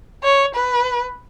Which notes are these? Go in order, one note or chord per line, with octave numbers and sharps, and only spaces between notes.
C#5
B4